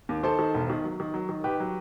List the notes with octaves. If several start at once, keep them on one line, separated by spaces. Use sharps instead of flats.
D#2
D#3 A4 C5
D#3
E1
D#3
F#3
D#3
F#3
D#3
D#3 G4 B4
F#3